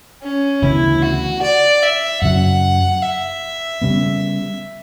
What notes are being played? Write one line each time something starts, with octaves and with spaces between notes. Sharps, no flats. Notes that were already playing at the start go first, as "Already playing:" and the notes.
C#4
D2 C#3 E3 B3 E4
F#4
D5
E5
F#2 C#3 F#3 C#4 F#5
E5
C#3 G3 B3